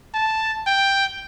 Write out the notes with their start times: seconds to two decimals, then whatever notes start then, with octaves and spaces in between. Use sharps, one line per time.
0.14 A5
0.67 G5